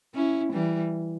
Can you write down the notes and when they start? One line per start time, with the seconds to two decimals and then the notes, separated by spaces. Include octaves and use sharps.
0.15 C#4 E4
0.53 E3 G3